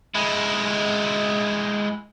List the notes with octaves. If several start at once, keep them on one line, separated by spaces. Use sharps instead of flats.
G#3 E4